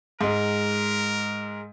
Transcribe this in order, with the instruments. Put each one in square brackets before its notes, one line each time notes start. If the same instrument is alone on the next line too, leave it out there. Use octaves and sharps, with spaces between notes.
[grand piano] G#2 G#3 [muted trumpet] A#4